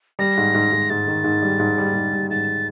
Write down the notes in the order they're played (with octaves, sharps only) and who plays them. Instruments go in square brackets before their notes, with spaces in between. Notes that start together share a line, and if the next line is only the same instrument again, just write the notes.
[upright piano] G3 [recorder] A#6
[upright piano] G#2
G#2
G#2
[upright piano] G#2 [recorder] A6
[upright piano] D#3
G#2
G3
G#2
G3
G#2
G3
[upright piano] G#2 [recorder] A6